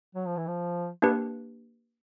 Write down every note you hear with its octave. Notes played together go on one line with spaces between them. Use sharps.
F#3
F3
E3
F3
A#3 D4 G4 B4